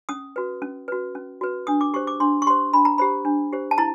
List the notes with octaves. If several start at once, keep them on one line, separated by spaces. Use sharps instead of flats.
C#4 D#6
F#4 B4
C#4
F#4 B4
C#4
F#4 B4
D4 D#6
D6
G4 C5 C#6
D6
D4 C6
C#6
G4 C5 C6
D4 B5
A#5
G4 C5 B5
D4
G4 C5
A5
E4 A#5